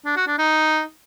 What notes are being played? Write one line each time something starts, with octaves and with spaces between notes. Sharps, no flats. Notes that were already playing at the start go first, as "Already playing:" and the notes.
D4
F#4
D4
D#4